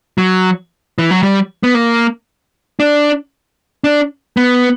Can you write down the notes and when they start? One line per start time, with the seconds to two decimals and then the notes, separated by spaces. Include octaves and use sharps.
0.18 F#3
0.98 E3
1.11 F#3
1.23 G3
1.63 B3
1.75 A#3
2.80 D4
3.84 D4
4.37 B3